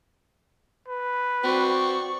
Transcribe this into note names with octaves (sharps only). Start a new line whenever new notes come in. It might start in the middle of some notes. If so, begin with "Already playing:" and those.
B4
C4 F#4 D5 C#6